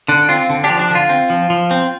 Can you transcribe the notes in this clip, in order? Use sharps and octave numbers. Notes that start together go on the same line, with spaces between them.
D3 D4
C4 F4
D3
D4 G4
F3
D4
D3
F4
C4
F3
F3
C4